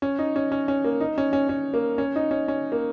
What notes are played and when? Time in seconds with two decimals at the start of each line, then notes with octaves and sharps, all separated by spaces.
0.02 C#4
0.19 D#4
0.36 C#4
0.52 C#4
0.68 C#4
0.84 A#3
1.00 D#4
1.18 C#4
1.33 C#4
1.49 C#4
1.74 A#3
1.98 C#4
2.16 D#4
2.31 C#4
2.48 C#4
2.72 A#3